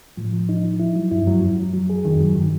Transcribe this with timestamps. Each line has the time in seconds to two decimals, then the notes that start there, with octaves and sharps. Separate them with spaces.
0.17 A2 F3
0.33 F3
0.49 D#4
0.64 F3
0.80 E4
0.95 F#3
1.11 G2 E4
1.20 F2
1.26 F#2 F#3
1.42 F#2 F#3
1.58 F#3
1.74 F#3
1.90 G#4
2.05 F2 D#3
2.16 F#2
2.21 G2 F#3
2.36 D#3